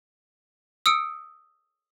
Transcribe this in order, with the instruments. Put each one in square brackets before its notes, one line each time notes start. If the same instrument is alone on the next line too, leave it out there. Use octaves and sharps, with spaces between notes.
[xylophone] D#6 E6 C#7 D7